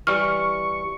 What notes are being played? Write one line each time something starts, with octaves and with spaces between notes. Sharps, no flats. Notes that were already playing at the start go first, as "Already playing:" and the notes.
E3 G3 C#6 F6